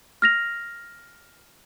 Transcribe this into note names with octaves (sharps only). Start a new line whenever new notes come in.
F6 A#6 F7